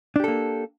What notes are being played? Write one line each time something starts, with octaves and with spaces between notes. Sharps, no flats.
A#3 D4 G4 A4